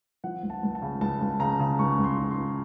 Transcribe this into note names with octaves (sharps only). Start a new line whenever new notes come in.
F3 F#5
C#2
A5
C#2
A5
C#3
C#2 A5
C#2
C#3 A#5
C#3
C#2 C#6
C#2
C6
C#2
C6
C#2